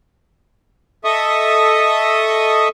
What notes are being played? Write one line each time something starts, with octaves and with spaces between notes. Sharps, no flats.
A4 D#5 E5 C#6 D#6